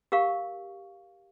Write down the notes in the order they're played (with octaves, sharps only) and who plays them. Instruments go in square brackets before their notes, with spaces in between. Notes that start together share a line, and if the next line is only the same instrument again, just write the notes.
[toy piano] G4 A#4 F5 C#6